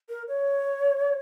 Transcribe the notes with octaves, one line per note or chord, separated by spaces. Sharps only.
A#4
C#5